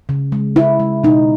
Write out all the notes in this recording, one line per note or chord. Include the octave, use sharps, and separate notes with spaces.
C#3
G#3
C#3 E4
G#3
B2 D#4